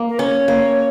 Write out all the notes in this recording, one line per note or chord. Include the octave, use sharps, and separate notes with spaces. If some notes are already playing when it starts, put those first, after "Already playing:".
Already playing: A#3
A#4
C#4 C#5
A#3